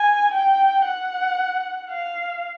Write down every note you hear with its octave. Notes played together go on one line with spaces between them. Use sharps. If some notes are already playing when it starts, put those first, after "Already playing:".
Already playing: G#5
G5
F#5
F5